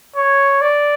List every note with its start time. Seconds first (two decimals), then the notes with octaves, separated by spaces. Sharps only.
0.16 C#5
0.61 D5